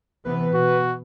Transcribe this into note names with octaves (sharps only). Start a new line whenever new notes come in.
C3 E3 B3 B4
B2 F#4